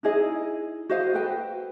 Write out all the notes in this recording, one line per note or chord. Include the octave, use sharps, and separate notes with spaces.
D#4 E4 G#4 D#5
F#4 C5 D#5 F5
A4 B4 G5